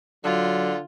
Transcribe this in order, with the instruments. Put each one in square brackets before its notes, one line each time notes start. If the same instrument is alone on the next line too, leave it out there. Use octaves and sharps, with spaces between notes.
[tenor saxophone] D3 [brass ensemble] F#3 [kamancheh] F4